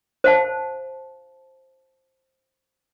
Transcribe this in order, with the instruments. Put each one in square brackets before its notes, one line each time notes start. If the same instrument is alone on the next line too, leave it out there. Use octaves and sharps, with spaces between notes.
[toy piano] C5 F5 A5